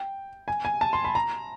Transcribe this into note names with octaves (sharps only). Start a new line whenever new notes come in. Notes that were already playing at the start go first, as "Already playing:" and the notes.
Already playing: G5
G#5
G#5
A5
C6
B5
A#5